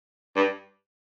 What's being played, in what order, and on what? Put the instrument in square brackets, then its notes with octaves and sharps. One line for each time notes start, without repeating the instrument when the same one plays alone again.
[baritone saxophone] G2